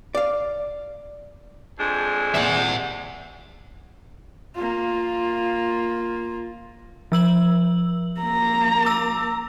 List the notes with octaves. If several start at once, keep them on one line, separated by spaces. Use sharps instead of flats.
D5 F5
F2 G#3 D4
C2 A#2 E5 F#5
A#3 F4
F3 E6 F#7
A#3 A#5
D6 E6